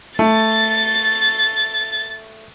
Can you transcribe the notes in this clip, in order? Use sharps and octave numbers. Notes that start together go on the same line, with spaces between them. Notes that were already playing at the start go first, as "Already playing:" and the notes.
A3 A6